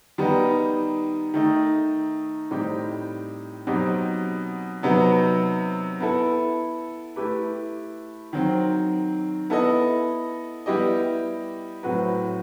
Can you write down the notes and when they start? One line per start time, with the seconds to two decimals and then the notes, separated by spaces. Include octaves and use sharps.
0.18 D#3 G3 B3 D#4
1.34 D#3 A3 D#4
2.51 A2 G3 C4 D#4 G4
3.67 B2 F#3 C4 D#4 G4
4.83 C3 F#3 B3 D#4
6.00 B3 E4 A4
7.16 A3 E4 G4 B4
8.33 D#3 F#3 C4
9.50 B3 E4 A4 D#5
10.66 G3 B3 E4 G4 D#5
11.83 A2 F#3 C4 F#4 B4